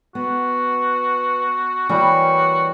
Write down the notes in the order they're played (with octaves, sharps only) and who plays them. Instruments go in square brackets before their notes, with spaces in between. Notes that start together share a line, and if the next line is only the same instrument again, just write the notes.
[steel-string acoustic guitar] B3 [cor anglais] F#4
[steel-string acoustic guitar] E3 A#3 G4 [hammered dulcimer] G3 C#5 [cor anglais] F#4